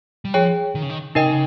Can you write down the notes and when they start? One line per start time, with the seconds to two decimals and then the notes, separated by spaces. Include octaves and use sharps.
0.25 G3
0.34 F3 G#4 C#5 G5
0.75 D#3
0.83 C#3
0.89 D#3
1.15 C#3 D#4 A#4 D#5 G5
1.24 C3
1.31 C#3